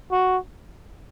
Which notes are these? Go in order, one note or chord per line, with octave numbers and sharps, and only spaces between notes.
F#4